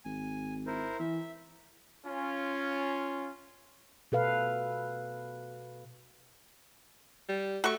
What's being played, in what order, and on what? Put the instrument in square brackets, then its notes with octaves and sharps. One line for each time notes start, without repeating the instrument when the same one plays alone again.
[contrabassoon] G#1 [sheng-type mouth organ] G#5
[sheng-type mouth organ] E4 A#4 C5
[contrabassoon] E3 [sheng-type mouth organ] E5
[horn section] C#4 F4
[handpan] B2 A4 B4 F5
[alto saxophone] G3
[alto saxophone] A3 [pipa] F#4 C#6